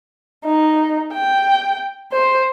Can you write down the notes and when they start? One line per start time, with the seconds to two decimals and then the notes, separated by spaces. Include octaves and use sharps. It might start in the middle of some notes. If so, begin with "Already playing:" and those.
0.45 D#4
1.13 G5
2.12 C5